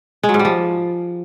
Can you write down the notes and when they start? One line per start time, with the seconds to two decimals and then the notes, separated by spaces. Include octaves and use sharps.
0.23 G#3
0.29 F#3
0.34 G#2
0.39 G3
0.45 F3